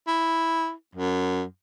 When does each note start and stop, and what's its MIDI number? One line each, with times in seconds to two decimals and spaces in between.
0.08 0.72 64
0.96 1.43 42